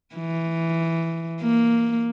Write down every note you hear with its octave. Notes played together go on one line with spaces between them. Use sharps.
E3
A#3